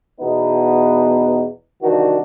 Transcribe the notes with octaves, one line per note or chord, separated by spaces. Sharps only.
E2 B2 B3 D#4 B4
C2 D#3 E3 D4 F#4